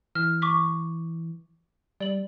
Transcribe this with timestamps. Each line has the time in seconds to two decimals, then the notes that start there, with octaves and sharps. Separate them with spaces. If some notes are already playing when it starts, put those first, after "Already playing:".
0.15 E3 F6
0.42 C#6 D6 B6
2.00 G3 D5 F#7